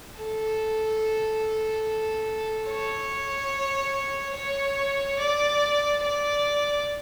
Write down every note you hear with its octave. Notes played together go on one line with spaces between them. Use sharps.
A4
C#5
C#5
D5
D5